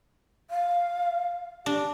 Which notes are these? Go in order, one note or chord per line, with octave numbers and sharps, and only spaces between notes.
F5
D4 G4